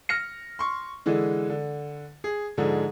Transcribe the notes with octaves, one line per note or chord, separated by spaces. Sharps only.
F6 A#6 C#7
C6 C#6
D3 E3 G#3
D3
G#4
G#2 D3 F3 G#3